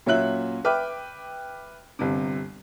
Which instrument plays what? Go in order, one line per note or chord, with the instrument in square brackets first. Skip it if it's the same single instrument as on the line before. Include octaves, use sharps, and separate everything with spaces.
[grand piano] A#2 F#3 C#4 E5 F#6 F#7
B4 E5 G5 D6 F6
G1 C3